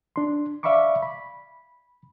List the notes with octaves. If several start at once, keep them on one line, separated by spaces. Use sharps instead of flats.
D4 C6
D5 E5 F5 B5 C#6 D6
B5